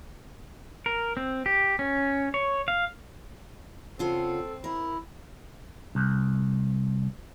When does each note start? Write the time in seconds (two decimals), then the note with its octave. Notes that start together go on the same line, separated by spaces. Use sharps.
0.86 A#4
1.17 C4
1.46 G4
1.79 C#4
2.34 C#5
2.68 F5
3.99 C#3 C4 F4 A4 F#5
4.64 E4 A#4
5.95 C2